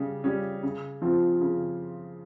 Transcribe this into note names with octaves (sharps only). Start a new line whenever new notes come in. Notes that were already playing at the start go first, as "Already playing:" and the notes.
Already playing: C#3 G3
G3 C#4
C#3
F3 C4 F4
C#3